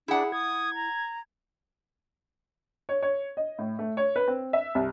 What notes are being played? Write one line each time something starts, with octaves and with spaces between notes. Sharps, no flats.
D4 E4 G#4 F#5
D#6 G#6
A#5
C#5
C#5
D#5
A2
A3
C#5
B4
C4
E5
C2